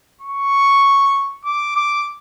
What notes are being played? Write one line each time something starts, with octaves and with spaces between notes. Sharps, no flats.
C#6
D6
D6